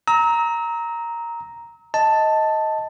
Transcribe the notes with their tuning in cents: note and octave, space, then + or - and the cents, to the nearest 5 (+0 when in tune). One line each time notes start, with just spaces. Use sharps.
A#5 +0 E6 -40
D#5 +15 A5 +5